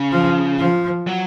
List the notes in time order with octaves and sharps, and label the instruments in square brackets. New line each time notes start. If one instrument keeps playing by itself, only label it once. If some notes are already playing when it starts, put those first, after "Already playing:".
Already playing: [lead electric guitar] C#3
[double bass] F3
F3
[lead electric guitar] F#3